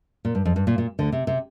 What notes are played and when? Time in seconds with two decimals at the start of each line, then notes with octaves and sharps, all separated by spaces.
0.25 A#2
0.35 G2
0.45 F2
0.56 G2
0.67 A#2
0.78 A#2
0.99 D2 D3
1.12 C3
1.27 C3